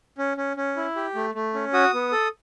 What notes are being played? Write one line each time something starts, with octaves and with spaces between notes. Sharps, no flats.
C#4
C#4
C#4
E4
G4
A3
A3
C#4
F#4 D#6
B3
A4